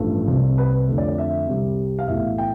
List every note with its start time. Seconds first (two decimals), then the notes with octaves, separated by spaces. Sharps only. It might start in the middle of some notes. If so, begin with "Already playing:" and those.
Already playing: A1 G2 F3 A3
0.28 C2 C3 G3
0.58 B4
0.88 F2 D3 A3
0.98 D5
1.08 D5
1.18 E5
1.48 C2 C3 G3
1.99 F5
2.08 B1 A2 E3 A3 E5
2.38 G5